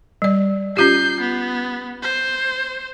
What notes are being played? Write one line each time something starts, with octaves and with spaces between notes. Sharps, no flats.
G3 D5
C#4 F4 G4 G6 C7
B3
C5